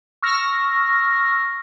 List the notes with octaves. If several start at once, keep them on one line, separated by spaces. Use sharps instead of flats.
C#6 E6 F6 A#6